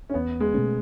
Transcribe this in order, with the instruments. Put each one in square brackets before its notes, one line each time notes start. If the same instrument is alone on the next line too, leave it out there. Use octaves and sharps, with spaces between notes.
[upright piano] C#4
[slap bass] E2 [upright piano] B3
[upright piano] G#3
[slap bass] B2 A3 C#4